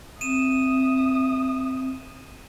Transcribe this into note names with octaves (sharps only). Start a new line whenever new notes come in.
C4 E5 D#6 D#7 E7